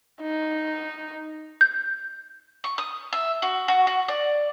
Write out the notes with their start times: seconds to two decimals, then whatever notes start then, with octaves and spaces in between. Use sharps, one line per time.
0.21 D#4
1.61 G6
2.64 C#6
2.78 D#6
3.13 E5
3.42 F#4
3.68 F#4
3.87 F#4
4.08 D5